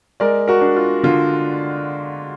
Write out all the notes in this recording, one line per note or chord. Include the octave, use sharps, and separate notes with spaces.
G#3 A#4 D5
F#4 A#4
D4
F4
D3 F4